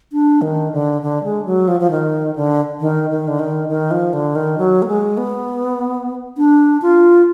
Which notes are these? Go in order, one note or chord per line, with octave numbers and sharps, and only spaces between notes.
D4
D#3
D3
D3
G#3
F#3
F3
F3
D#3
D3
D#3
D#3
D3
D#3
D#3
F3
D3
D#3
F#3
A#3
G#3
B3
D4
F4